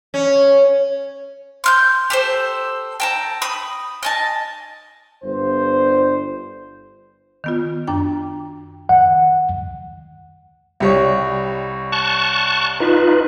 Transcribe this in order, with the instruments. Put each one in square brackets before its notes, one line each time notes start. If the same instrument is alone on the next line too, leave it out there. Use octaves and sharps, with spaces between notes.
[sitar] C#4
[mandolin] C6 F6 G6
G4 A4 C5
G5 A5 A#5
B5 D#6
D#5 G#5 A5
[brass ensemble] G1 C5
[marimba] D#3 B3 F4
F#2 D4 G5
[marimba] D#3 [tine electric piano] F#5
[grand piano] C2 G3 C#5
[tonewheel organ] A5 C#6 F#6
D#4 F4 B4